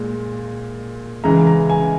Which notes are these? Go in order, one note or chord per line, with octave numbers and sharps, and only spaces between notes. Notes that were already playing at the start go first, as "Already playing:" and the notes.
Already playing: A#2 G#3
C#2 C#3 E3 G#3 A#5
A#5
G#5